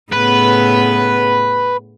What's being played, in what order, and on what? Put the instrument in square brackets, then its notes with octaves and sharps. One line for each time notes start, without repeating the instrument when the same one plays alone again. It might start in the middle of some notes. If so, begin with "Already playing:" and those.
[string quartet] A2 C#3 B3 [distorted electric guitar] B4